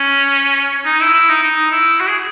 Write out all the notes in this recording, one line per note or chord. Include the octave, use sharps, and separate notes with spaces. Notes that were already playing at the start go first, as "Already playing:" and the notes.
Already playing: C#4
D#4
E4
E4
D#4
D#4
E4
F#4
G#4